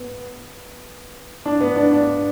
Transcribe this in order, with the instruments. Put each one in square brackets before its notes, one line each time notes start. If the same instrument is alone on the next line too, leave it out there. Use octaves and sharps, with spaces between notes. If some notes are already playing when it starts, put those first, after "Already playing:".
Already playing: [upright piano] B3
D4
B3
D4
D4